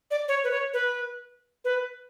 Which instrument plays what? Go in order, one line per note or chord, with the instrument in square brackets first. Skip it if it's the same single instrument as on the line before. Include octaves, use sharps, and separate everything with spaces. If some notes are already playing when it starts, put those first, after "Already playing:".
[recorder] D5
C#5
B4
C#5
B4
B4